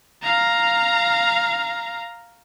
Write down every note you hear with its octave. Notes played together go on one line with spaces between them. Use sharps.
F5 A#5